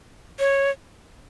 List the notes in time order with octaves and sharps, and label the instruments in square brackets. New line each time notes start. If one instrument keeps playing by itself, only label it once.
[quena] C#5